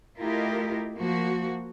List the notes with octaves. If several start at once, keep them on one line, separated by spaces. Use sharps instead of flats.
A3 E4 F4 G4 A#4 D#5
F3 A#3 F#4